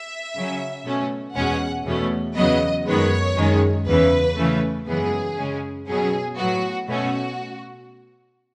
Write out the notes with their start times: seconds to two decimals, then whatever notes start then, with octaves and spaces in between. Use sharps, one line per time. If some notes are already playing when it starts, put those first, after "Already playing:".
Already playing: E5
0.35 C#3 F#3 C#4
0.85 B2 A3 C#4
1.35 E2 B2 G#3 C#4 F#5
1.85 E2 B2 A3 C#4
2.36 E2 C#3 F#3 B3 D#5
2.86 F#2 D#3 G#3 B3 C#5
3.37 F#2 D#3 G#3 C#4
3.86 E2 C#3 E3 B4
4.37 C#3 E3 A3 C#4
4.87 F#2 C#3 E3 G#3 B3 G#4
5.37 C#3 G#3 C#4
5.88 B2 F#3 C#4 G#4
6.37 A2 F#3 B3 F#4
6.88 B2 A3 C#4 F#4